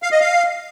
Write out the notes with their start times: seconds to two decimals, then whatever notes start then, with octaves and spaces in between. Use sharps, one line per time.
0.03 F5
0.12 D#5
0.21 F5